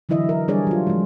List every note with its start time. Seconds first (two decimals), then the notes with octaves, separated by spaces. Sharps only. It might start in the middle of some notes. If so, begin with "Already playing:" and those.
0.09 D3 E3 F#3 E4 D#5 E5
0.29 A#4
0.48 G3 D4 G#4 C#5 D5
0.67 F#3 F4
0.87 F3 G#3